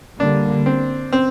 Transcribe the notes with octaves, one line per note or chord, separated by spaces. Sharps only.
D3 G3 A#3 D4
C4
C4